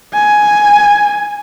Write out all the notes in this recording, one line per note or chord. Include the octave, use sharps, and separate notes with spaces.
G#5